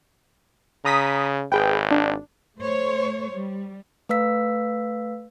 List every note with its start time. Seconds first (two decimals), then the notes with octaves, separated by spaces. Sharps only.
0.85 C#3 A#5 D#6 B6
1.52 G#1 G#4 B4 G5
1.91 D4
2.57 A3 C5 C#5
3.32 G3
4.09 A3 B4 F5 E6 B6